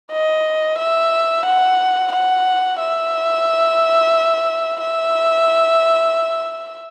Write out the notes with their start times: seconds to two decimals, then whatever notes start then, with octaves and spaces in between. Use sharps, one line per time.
0.12 D#5
0.79 E5
1.46 F#5
2.13 F#5
2.80 E5
4.81 E5